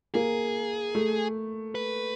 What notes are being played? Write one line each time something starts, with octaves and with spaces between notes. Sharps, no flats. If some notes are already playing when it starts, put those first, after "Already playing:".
A#3 G#4
A3
B4